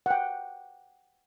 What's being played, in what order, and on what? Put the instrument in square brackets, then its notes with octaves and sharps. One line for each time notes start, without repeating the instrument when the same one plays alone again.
[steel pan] F#5 G5